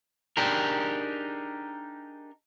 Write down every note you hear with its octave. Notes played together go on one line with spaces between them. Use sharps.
D4 D#4 G4 G#4 A#4